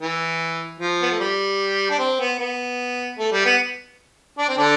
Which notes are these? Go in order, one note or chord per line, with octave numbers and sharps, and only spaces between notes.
E3
F3
B3
A3
G3
D4
C4
B3
B3
A3
G3
B3
D4
C4
D3 D4